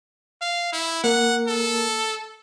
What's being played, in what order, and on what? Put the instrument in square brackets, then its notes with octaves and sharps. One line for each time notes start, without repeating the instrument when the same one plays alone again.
[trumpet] F5
E4
[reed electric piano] A#3 A#4 [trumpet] F#5
[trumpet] A4